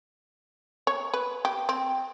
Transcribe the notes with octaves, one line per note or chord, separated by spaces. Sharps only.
C#5
B4
G4
C4